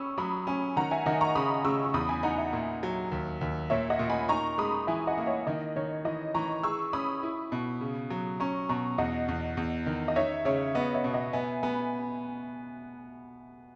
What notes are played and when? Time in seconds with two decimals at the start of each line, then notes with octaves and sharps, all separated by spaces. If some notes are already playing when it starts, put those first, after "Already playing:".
Already playing: C#4 B5 C#6 D#6 E6
0.18 F#3 B5 D#6
0.47 C#4 G#5 B5
0.76 D#3 F#5 A#5
0.91 E5 G#5
1.06 D#3 D#5 F#5
1.21 A#5 C#6
1.35 C#3 B5 D#6
1.64 C#3 C#6 E6
1.84 C#6
1.94 E2 B5 D#6
2.09 G#5 B5
2.23 D#4 F#5 A#5
2.38 E5 G#5
2.53 A#2
2.83 F#3
3.12 D#2
3.41 D#2
3.70 A#2 C#5 E5
3.90 D#5 F#5
3.99 A#2
4.10 G#5 B5
4.29 D#4 A#5 C#6
4.58 G#3 B5 D#6
4.87 E3 E5 G#5
5.07 D#5 F#5
5.18 A#3
5.27 C#5 E5
5.47 D#3 D#5
5.76 D#3 C#5
6.05 E3 D#5
6.34 E3 A#5 C#6
6.63 G#4 C#6 E6
6.93 C#4 B5 D#6
7.23 E4
7.52 B2
7.81 C#3
8.10 F#3
8.40 C#4 A#5 C#6
8.69 B2 A#5 C#6
8.98 E2 D#5 F#5
9.28 E2
9.57 E2
9.86 D#3
10.08 D#5
10.16 D#4 C#5 E5
10.45 C#3 C#5 E5
10.75 B3 D#5 F#5
10.94 C#5 E5
11.04 B2
11.14 D#5 F#5
11.33 B3 E5 G#5
11.63 B3 G#5 B5